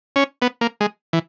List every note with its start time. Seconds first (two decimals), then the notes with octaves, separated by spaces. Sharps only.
0.16 C#4
0.42 B3
0.61 A#3
0.81 G#3
1.13 E3